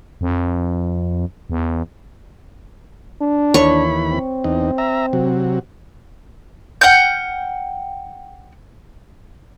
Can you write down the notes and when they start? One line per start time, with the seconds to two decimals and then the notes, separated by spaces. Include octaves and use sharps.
0.21 F2
1.50 E2
3.21 D4
3.54 D#2 E3 C#5 B5 C#6
4.12 C4
4.44 E2 D#4
4.78 E5 A#5
5.13 C3 F#3
6.81 F#5 G5 F6 G6